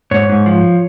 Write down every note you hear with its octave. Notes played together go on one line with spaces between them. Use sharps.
G#2 C#5
G#2
F3